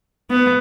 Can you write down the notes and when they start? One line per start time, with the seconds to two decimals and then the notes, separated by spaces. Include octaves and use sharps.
0.30 B3